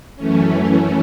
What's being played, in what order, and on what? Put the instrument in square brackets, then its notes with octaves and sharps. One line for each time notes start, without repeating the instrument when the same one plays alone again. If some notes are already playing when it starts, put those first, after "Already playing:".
[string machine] F#2 E3 A3 C#4